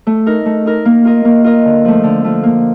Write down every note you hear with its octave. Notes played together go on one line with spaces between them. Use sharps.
A3
D#4 A#4
A3
D#4 A#4
A#3
F4 A#4 D#5
A#3
F4 A#4 D#5
D3
F3 A3
D3
F3 A3
A#3